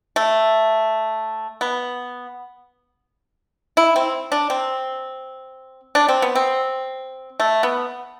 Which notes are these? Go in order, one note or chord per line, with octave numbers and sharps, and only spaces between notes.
A3
B3
E4
C4
D4
C4
D4
C4
B3
C4
A3
B3